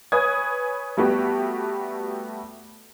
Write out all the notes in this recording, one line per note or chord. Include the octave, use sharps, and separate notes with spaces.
B4 C#5 G#5 D#6 G#6
G3 A3 B3 F#4 G4